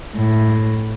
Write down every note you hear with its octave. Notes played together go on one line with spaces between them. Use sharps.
A2